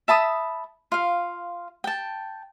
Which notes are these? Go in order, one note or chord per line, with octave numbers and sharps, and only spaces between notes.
E5 A5 B5 D#6
F4 F5
G5 A5